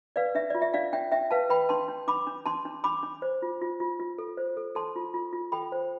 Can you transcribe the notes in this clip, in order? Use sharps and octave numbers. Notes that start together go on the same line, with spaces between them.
B4 D5 F5
D4 E5
F4 D5
E5
D4 D5 F5
D4 E5 G5
D4 E5 G5
B4 F5 A5
B4 G5 B5
D4 A5 C6
D4
D4 B5 D6
D4
D4 A5 C6
D4
D4 B5 D6
D4
C5
F4
F4
F4
F4
A4
C5
A4
A4 A5 C6
F4
F4
F4
A4 G5 B5
C5